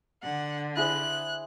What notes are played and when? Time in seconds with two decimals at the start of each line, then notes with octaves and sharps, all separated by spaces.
0.22 D3 F#5
0.76 E4 G#4 C5 F#6